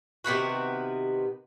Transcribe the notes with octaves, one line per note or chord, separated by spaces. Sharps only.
C3 D#3 B3 F#4